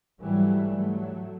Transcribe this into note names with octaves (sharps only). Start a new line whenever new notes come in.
G#2 E3 F#3 G3 A3
F#3 A3